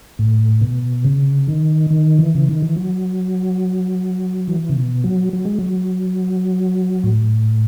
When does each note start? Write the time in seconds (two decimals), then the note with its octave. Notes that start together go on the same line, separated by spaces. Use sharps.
0.19 A2
0.61 B2
1.05 C#3
1.48 D#3
1.90 D#3
2.19 E3
2.35 C#3
2.49 D#3
2.62 E3
2.76 F#3
4.47 E3
4.69 C#3
4.76 B2
5.04 F#3
5.33 F#3
5.45 G#3
5.58 F#3
7.04 A2